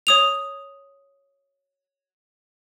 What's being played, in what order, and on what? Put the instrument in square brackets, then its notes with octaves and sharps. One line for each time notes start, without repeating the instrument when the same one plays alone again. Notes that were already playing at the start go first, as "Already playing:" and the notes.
[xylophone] C#5 D#6 F7